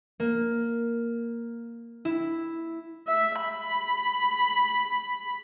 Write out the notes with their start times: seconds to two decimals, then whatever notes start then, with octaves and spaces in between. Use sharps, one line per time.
0.20 A#3
2.05 E4
3.08 E5
3.42 B5